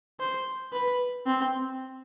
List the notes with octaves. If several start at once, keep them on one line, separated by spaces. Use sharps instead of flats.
C5
B4
C4